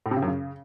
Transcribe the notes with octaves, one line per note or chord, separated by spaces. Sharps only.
A2
C3
C#3
F#2
C#3